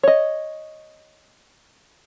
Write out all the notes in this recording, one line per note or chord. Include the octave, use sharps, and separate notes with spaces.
C#5 D#5